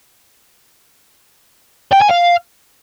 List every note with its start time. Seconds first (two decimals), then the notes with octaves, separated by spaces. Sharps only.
1.93 G5
2.02 G#5
2.11 F5